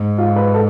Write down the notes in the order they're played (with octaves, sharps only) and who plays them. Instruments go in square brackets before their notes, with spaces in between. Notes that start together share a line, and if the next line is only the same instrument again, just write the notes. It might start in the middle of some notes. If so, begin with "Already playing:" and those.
Already playing: [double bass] G#2
[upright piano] F4
B4
A4